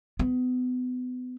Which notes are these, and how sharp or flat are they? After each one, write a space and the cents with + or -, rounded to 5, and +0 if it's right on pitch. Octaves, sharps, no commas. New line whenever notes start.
B3 +30